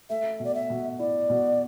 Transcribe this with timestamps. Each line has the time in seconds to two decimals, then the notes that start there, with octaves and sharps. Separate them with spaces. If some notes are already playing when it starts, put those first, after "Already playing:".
0.10 A3 E5
0.40 B2 D5
0.55 E5
0.70 B2
0.99 E4 D5
1.30 B2